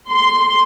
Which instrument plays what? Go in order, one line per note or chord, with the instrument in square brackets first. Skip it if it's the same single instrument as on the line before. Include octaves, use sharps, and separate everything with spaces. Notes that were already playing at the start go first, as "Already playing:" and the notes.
[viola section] C6